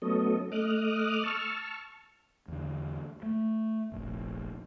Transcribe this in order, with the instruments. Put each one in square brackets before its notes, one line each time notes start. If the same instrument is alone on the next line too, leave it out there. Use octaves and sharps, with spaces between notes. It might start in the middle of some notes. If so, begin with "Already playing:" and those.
[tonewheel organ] F#3 A3 B3 C#4 A4 D#5
A3 D#5 D6 D#6 F6 F#6
A5 C#6 E6 F6
[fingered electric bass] E2 D3
A3
F1 A#1